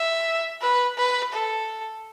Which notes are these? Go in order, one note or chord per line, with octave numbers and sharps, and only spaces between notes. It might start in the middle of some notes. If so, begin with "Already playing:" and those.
Already playing: E5
B4
B4
A4